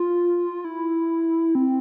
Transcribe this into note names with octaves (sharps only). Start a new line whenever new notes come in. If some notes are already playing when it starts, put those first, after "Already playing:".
Already playing: F4
E4
C4